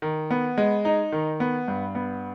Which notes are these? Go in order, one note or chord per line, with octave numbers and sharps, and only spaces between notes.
D#3
B3
G#3
D#4
D#3
B3
G2
B3